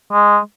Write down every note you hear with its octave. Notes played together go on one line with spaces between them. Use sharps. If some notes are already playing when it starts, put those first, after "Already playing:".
G#3